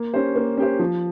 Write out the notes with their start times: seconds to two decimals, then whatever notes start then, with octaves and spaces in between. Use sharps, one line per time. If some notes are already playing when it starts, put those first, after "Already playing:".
Already playing: A#3
0.14 C#4 G4 C5
0.35 A#3
0.58 C#4 G4 C5
0.79 F3